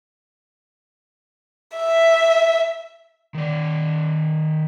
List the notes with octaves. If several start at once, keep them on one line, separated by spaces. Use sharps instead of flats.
E5
D#3 D5